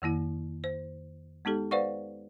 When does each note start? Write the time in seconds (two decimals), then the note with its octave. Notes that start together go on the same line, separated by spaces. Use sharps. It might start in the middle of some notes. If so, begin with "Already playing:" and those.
0.02 F2 D#3 A#3 E4
0.64 C5
1.45 G#3 B3 D#4 G4 A4
1.71 B4 C5 D5 F5 F#5 C#6